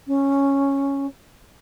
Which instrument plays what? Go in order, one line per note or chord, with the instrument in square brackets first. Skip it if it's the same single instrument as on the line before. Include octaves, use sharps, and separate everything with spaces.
[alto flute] C#4